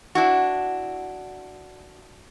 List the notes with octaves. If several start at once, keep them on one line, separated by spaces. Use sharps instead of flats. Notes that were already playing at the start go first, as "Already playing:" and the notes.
D4 E4 F#4